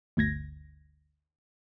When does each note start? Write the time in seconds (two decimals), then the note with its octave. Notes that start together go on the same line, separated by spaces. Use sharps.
0.17 G1 D2 G#6 A#6